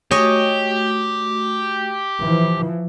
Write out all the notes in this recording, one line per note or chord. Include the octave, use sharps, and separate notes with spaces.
A3 F#4 G4 C#5 D#5 G#5
E3 F3